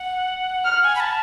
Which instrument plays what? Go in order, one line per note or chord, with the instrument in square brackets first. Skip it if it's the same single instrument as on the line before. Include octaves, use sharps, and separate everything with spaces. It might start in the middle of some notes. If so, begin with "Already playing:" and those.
Already playing: [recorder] F#5
[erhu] F6
[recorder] G#5
B5
A5